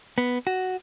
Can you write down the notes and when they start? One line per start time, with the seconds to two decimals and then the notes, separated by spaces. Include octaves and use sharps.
0.18 B3
0.47 F#4